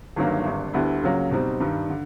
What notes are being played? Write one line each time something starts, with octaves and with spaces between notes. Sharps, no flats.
G1 G2 D#3 F#3 A#3
G#1 G2 D3
D2 D3 G3 B3 E4
C#2 C#3 F#3 A#3
B2 G3 C4 D#4
G2 D#3 G3
D3